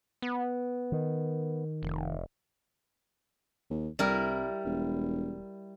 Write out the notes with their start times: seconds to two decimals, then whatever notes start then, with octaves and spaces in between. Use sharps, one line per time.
0.22 B3
0.92 D#3
1.83 F1
3.70 D#2
3.99 C2 G3 E4 A#4
4.65 E1